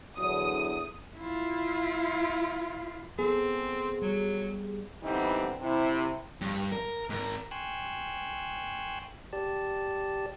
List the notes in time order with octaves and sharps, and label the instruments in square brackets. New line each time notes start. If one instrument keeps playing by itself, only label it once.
[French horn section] E2 D3 F#3 [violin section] D#6
[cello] E4 F4
[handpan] B3 A4 [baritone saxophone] C4 [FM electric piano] G#4
[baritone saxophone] F#3 [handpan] G3
[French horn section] D3 E3 G3 B3 C4 D#4
C3 E4
[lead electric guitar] G2
A#4
G#2 A#4
[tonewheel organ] G5 G#5 C6 C#6 E6 F#6
G4 D5 A5